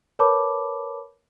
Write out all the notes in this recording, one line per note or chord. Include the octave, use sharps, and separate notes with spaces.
A#4 B4 C#5 A5 B5 D6